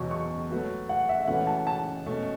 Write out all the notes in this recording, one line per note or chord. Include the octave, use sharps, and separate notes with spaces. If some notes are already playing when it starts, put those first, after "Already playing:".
Already playing: E2 B2 F#3 C#6
C#6
F#3 A3 F#4 B4
F#5
E5
E5
E3 A3 C#4 F#4 B4 F#5
A5
A5
B2 A3 C#4